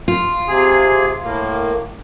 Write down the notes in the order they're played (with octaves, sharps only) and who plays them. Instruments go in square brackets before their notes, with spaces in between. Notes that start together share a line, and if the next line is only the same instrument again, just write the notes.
[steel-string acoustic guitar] F4
[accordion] C3 G#4
A2 A#3